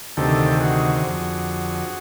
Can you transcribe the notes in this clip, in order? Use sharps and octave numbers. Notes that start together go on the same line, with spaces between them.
D2 C3 D#3 G4 A4
F#4 G#4
F2 D3